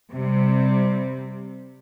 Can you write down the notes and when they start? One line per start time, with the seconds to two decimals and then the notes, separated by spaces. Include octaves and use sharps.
0.11 C3 G3